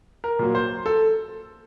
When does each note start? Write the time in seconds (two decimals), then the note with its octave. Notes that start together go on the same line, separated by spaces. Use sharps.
0.24 A#4
0.39 A#2 F#3 A#3
0.55 C5
0.86 A4